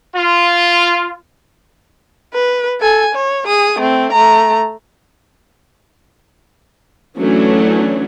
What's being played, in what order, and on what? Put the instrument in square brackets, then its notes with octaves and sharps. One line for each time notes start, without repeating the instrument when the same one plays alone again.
[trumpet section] F4
[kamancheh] B4
A4 G#5
C#5
G#4 D#6
A3 C4
A3 A#5
[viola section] E3 F#3 A3 C#4 D4